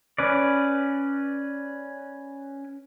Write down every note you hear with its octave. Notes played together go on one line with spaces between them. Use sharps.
C#4 B4 D5